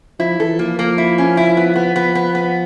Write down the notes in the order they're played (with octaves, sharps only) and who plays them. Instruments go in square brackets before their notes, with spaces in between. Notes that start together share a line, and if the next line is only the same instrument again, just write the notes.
[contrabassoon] F3 [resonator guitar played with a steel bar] E4
[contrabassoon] E3 [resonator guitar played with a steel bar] A4
[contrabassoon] F3 [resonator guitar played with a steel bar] A#3
[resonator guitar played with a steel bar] A#3
E4
C#4
E4
B3
B3
[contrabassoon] F3 [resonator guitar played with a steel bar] B3
[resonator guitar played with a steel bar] B3
B3